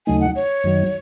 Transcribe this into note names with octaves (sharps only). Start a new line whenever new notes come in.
D#2 C#3 F#3 A3 D#4 G#5
F#5
C#5
F#2 D#3 F#3